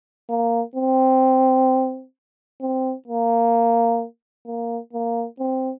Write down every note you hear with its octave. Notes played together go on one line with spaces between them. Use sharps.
A#3
C4
C4
A#3
A#3
A#3
C4